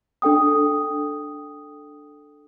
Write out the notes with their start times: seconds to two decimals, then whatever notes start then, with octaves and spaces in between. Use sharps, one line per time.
0.22 D4 A4 G5 D#6